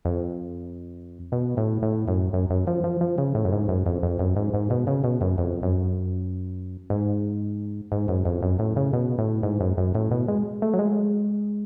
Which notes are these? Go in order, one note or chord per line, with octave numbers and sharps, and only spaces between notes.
F2
B2
A2
A2
F#2
F#2
F#2
F3
F3
F3
C#3
A2
F#2
G#2
F#2
F2
F2
F#2
G#2
G#2
B2
C#3
B2
F#2
F2
F#2
G#2
G#2
F#2
F2
F#2
A2
C#3
B2
A2
G#2
F#2
F#2
A2
B2
G#3
A3
F#3
G#3